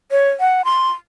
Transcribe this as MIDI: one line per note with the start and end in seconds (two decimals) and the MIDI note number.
0.11 0.30 73
0.40 0.65 78
0.65 0.91 84